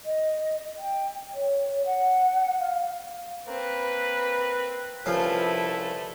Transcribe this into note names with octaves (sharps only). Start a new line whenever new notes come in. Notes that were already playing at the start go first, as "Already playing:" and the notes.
D#5
G5
C#5
F#5
F5
A#3 C4 B4
C2 F3 A3 C#4 E4 B4